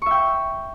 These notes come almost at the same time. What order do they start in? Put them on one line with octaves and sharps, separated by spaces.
C#6 E5 G5